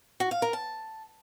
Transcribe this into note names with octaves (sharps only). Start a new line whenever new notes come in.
F#4
F5
A#4
A5